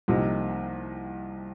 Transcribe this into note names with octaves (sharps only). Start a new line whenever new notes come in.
C2 C3 F3 A#3 D#4